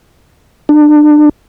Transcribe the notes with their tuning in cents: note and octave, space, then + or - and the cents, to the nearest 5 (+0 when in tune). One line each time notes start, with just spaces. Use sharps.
D4 +30